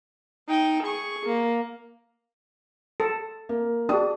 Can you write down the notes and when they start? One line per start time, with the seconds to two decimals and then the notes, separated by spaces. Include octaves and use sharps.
0.48 D#4 G5
0.83 G#4 C#6
1.26 A#3
3.00 A4
3.49 A#3
3.89 D4 F#4 G#4 D#6